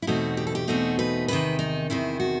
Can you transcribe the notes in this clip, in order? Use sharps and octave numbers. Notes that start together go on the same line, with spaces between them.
E4
E2 B2 A3 C4 D#4 F#4
G4
A4
G4
E2 B2 A3 C4 D#4 F#4
B4
E2 C3 D#3 B4
D#4
E2 C3 D#3 E4
F#4